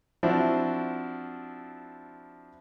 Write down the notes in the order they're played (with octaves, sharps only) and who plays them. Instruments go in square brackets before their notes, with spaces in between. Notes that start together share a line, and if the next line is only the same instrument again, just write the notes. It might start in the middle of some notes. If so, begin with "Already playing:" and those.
[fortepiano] F3 C4 D4 E4 F#4